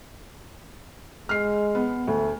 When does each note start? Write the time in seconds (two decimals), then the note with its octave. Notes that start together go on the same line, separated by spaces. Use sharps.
1.29 G#3 F6 C7
1.75 B3
2.07 D2 A3